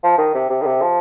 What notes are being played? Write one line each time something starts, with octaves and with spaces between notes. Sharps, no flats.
F3
D#3
C3
C3
D#3
C3
F3